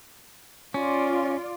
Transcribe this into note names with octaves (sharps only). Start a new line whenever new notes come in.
C#4 F4 D5